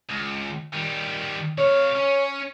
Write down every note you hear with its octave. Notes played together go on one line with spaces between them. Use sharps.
C#2
D#3 G3
C3 C#5 F5
C#4